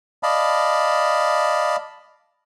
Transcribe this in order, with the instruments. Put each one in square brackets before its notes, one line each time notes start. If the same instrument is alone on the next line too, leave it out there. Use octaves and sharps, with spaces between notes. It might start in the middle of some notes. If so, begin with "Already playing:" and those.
[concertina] D5 D#5 F5 A5 B5